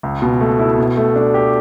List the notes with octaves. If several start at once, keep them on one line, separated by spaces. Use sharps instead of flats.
C#2
B2
A3
E4
B2
A3
D4
G4